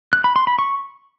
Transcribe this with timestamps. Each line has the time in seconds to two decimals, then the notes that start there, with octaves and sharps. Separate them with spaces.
0.13 F#6
0.24 B5
0.36 C6
0.47 B5
0.59 C#6